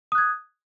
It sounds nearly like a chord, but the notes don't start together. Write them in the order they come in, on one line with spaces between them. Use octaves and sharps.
D#6 F#6 G#6